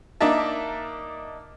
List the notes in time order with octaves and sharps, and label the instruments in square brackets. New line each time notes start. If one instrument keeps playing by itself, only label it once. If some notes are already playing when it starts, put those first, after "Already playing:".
[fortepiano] A#3 D4 D#4 A#4 E5 A5